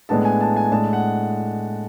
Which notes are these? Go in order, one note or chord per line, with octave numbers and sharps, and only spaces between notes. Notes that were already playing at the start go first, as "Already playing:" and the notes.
A2 G#3 B3 D4 A5
G#5
A5
G#5
A2 G#3 D4 A5
F#5